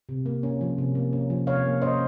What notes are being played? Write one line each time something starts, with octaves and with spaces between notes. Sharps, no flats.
C3
A#3
C#4
F3
C3
A#3
C#4
F3
C3 C#5 F5
A#3
C#4 C5 D#5